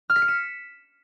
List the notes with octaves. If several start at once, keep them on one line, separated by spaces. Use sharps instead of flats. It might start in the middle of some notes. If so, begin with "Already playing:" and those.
F6
B6
C#7
E7